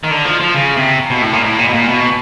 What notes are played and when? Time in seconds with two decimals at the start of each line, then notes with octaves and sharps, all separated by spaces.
0.04 D#3
0.11 D3
0.25 F3
0.40 F3
0.54 C#3
0.77 C3
1.10 B2
1.21 A2
1.33 A#2
1.44 A2
1.59 A#2
1.68 B2
1.73 A#2
1.88 B2